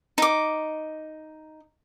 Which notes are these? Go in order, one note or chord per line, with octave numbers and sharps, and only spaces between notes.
D#4 D6